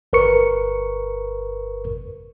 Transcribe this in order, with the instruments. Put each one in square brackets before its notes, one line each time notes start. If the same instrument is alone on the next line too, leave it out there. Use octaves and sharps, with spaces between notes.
[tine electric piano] G1 A#4 B4 C#6 C#7